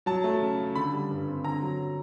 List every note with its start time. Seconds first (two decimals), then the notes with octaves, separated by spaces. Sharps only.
0.06 F#3 A5
0.24 A3
0.40 C#3
0.58 C#3
0.75 D3 B5
0.92 G3
1.10 G2
1.28 C4
1.44 D3 A#5
1.62 F#3